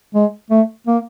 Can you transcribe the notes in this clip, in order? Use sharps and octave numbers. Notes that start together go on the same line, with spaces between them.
G#3
A3
A#3